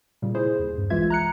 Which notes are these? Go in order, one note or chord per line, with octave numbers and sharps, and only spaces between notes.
A#2 C#3 G3
E4 G#4 C5
D#2
G2
B1 E3 G#3 F4 E5 G#6
A#5 F#6 C#7